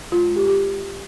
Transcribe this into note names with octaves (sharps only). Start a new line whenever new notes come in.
G#3 F4
G#3
G4
G4